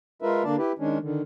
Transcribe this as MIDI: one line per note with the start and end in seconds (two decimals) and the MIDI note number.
0.22 0.43 56
0.22 0.43 65
0.22 0.43 70
0.22 0.43 71
0.22 0.43 76
0.44 0.56 50
0.44 0.56 58
0.44 0.56 62
0.44 0.56 74
0.44 0.56 81
0.58 0.72 64
0.58 0.72 67
0.58 0.72 71
0.79 0.98 51
0.79 0.98 56
0.79 0.98 61
0.79 0.98 62
1.01 1.22 50
1.01 1.22 51